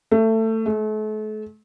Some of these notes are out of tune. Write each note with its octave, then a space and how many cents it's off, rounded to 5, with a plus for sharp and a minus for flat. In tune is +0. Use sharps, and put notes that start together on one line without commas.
A3 +20
A3 -40